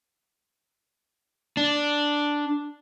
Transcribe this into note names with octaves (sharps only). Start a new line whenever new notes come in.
D4